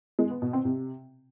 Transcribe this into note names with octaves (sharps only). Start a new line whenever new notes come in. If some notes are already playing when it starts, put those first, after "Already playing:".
G#3
B3
B2
C4
C3